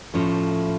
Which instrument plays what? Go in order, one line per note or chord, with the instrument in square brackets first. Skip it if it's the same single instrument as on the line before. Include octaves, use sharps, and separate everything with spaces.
[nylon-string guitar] A2 F3 A3 C#4